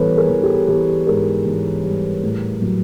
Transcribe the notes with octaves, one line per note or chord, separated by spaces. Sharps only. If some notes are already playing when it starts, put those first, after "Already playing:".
Already playing: E3 G3 B3 A4 B4 C#5
G#4 A#4
E3
G4 A4
E3 G4 A4
G#2 G#4 A#4
E3
G3
A2
F#3